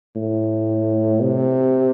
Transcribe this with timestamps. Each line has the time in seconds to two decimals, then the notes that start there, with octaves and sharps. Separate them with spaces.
0.16 A2
1.22 C3